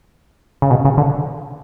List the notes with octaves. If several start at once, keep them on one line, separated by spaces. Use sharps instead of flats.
C#3
B2
C#3
D3